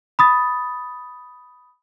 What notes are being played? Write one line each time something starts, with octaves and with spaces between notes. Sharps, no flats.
B5 D#6 A6